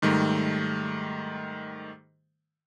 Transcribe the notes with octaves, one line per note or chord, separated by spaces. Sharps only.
G#2 D#3 G3 A3